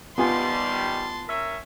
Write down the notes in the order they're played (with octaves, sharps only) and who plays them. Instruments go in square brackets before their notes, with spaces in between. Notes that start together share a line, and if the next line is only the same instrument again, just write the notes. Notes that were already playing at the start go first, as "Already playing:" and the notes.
[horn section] D#3 G3 [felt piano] B3 F4 G#5 [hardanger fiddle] A5 C6
[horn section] C#4 A#4 E5